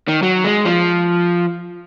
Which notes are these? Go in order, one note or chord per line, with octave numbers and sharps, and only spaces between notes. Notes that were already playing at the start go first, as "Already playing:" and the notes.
D#3
F#3
G#3
F3